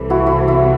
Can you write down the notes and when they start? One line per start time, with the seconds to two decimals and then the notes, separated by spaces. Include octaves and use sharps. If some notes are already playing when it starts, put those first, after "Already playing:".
Already playing: C2 C3 E3 A4
0.10 E4 F#4
0.27 E4 F#4
0.48 E4